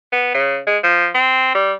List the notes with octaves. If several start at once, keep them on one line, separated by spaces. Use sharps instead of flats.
B3
C#3
G#3
F3
C4
G3